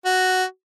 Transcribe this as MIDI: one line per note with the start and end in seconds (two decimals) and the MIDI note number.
0.05 0.44 66